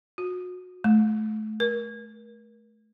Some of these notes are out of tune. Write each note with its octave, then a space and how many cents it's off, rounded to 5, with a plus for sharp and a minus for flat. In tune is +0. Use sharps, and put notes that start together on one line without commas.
F#4 -30
A3 -30
A#4 +40